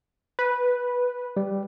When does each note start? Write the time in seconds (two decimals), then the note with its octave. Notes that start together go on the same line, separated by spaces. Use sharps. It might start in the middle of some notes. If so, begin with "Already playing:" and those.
0.39 B4
1.37 G3